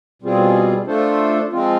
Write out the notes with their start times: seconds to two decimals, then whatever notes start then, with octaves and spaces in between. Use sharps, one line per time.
0.22 B2 G3 C4 F4 G#4
0.87 A3 D4 F4 A4 C5
1.51 F3 G#3 C4 F4